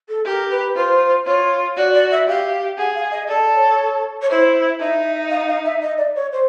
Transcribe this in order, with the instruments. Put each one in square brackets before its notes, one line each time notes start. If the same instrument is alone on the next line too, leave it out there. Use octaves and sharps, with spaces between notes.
[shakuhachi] A4
[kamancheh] G4 [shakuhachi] A#4
[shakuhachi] B4
[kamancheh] F4 [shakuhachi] C5
[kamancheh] F4 [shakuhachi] C#5
[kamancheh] F#4 [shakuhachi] D5
[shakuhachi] D5
E5
[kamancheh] G4 [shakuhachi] F5
[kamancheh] G#4 [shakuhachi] F#5
[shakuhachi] F5
D#5
[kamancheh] A4 [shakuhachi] D5
[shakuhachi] C#5
C#5
[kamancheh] E4 [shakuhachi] C5
[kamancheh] D#4 [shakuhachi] E5
[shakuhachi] F5
F5
E5
D#5
D5
C#5
C5